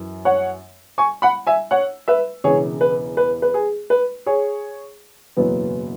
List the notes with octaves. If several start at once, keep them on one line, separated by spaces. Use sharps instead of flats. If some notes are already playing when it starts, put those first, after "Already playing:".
Already playing: F#2 E3
C#5 F#5
G#5 C#6
F#5 B5
E5 G#5
C#5 F#5
B4 E5
E1 E2 C#3 G#4 C#5
B4
B4
B4
G#4
B4
G#4 C#5
F#1 E2 B2 F#3 B3